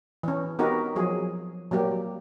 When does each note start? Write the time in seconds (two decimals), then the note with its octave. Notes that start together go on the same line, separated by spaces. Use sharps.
0.23 E3 C#4
0.59 B3 D#4 F#4 G4 A#4 B4
0.96 F3 F#3 G#4
1.71 F#3 G3 A#3 G4